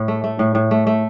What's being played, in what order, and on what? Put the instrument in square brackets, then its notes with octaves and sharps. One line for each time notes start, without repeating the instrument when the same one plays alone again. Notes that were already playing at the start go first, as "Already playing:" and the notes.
Already playing: [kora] A2 E4
A3
A3
A2
A2
A3
A3